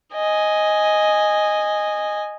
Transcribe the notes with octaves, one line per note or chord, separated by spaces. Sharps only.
D#5 G#5